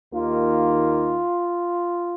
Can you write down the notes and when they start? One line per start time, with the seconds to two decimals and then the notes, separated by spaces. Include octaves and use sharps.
0.13 D#2 D#3 A#3 F4